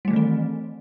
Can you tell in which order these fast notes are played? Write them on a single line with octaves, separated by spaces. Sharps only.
G3 A3 E3 D#3 C4